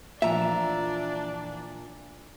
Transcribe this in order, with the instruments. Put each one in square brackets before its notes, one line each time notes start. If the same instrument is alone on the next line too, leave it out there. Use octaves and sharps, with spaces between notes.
[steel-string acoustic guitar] A#2 A#5 [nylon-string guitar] E3 F3 A#4 [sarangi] D4 [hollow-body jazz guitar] E5